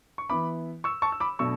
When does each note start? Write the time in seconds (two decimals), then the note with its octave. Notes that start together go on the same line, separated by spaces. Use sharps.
0.18 C#6
0.30 E3 B3 E4 B5 D6
0.84 C#6 E6
1.02 A5 C#6
1.12 E6
1.20 B5 D6
1.39 B2 F#3 A3 D4 C#6 E6